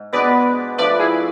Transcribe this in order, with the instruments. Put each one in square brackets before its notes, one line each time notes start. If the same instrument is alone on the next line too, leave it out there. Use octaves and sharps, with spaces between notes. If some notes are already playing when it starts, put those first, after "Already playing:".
Already playing: [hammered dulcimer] G#2
[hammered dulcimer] B2 G#3 B3 D4 [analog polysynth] B4 D5
[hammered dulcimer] F3 A3 D4 [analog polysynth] B4 D5
[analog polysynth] E4 G#4